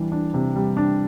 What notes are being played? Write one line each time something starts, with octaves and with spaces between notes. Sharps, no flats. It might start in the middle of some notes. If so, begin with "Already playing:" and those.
Already playing: E3 G3 D4
D4
C3
G3
D4